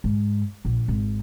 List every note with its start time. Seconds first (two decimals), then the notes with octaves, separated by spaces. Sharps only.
0.04 G#2
0.65 A#1
0.88 G#1